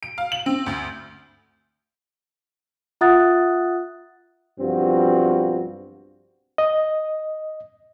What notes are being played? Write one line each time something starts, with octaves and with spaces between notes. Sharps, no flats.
D7
F5
F#7
C4
D2
F4 E5 F#5 D#6 F#6 A6
B1 G2 F3 C4 F4 F#4
D#5